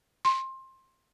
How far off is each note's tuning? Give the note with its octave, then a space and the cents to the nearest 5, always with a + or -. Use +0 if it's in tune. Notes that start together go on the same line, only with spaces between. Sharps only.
C6 +20